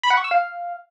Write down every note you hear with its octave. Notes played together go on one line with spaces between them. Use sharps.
B5
F#5
C#6
E6
F5